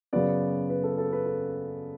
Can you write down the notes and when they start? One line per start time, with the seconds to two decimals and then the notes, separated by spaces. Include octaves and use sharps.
0.13 F#2 C#3 F#3 B3 D5
0.70 B4
0.84 A4
0.98 A4
1.13 B4
1.26 A4